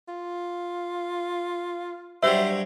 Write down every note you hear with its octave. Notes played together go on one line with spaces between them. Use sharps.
F4
G2 F#3 G3 C5 E5